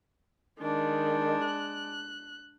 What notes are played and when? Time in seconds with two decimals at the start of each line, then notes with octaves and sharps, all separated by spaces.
0.61 D#3 G#3 D4
1.45 F#6